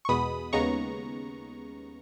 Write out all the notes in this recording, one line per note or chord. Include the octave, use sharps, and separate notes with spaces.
C#6
E2 B2 G#3 B3 B5 D#6
D#2 C#3 G#3 B3 A#5 C#6